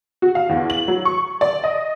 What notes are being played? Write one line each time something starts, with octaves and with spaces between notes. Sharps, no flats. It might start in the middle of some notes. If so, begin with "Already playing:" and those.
F#4
F5
E2
F#7
F#3
C#6
D5
D#5